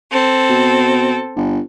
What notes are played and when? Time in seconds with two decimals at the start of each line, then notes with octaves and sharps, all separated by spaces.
0.11 C4 A4
0.49 B2
1.36 G1